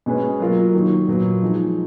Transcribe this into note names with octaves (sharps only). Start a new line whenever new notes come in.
B2 G#3 C#4 G#4 B4
F#3 A#3 F4 A#4
D#3 F#3 A#3 D#4 F#4
A#2 F#3 B3
F3 G#3 D#4